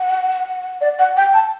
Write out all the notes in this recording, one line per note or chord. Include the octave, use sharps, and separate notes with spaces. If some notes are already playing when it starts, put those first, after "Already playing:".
Already playing: F#5
D5
F#5
G5
A5